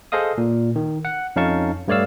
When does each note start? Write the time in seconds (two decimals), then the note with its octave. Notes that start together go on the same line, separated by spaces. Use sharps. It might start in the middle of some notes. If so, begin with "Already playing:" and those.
0.12 G#4 A4 C5 D#5 F5 D#6
0.38 A#2
0.76 D#3
1.05 F#5
1.36 F2 C#4 D#4 F5 A5 C#6
1.88 G2 A3 C#5 D5 F5 E6